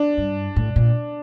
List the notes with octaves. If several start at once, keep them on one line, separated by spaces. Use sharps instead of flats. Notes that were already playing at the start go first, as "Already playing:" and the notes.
Already playing: D4
G2
A2
A#2